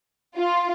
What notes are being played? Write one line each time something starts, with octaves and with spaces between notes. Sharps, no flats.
F4